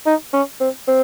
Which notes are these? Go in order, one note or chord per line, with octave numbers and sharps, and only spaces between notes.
D#4
C#4
C4
C4